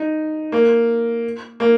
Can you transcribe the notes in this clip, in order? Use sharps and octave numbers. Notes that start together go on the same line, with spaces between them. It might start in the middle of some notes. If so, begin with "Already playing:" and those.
Already playing: D#4
A#3
A#3